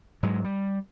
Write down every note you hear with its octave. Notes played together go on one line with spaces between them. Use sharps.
G#2 F#3 G#3
G3